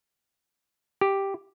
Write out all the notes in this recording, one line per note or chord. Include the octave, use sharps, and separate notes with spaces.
G4